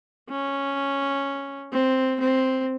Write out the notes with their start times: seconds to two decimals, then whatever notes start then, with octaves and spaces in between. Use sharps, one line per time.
0.30 C#4
1.72 C4
2.20 C4